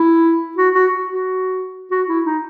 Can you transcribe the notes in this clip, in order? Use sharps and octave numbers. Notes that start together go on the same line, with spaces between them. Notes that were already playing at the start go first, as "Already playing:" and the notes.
Already playing: E4
F#4
F#4
F#4
F#4
E4
D#4